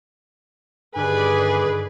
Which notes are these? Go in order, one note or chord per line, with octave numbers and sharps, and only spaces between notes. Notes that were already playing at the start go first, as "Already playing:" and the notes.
G2 D3 D#3 G#4 B4 D5 G#5